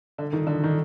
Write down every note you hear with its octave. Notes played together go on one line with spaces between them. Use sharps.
D3
D#3
D3
D#3